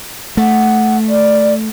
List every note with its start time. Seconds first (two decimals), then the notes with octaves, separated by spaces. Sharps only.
0.37 A3 F#5
1.08 D5